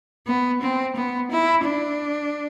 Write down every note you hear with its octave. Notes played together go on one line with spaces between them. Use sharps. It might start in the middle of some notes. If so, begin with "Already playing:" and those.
B3
C4
B3
E4
D4